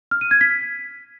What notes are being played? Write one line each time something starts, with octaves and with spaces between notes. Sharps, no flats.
F6
D#7
G#6
B6